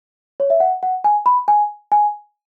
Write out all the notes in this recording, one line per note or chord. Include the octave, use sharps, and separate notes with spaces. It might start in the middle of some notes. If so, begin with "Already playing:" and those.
C#5
E5
F#5
F#5
G#5
B5
G#5
G#5